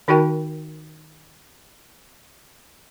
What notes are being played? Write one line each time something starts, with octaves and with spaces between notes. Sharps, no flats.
D#3 D#4 F#4 A#4 G5 A5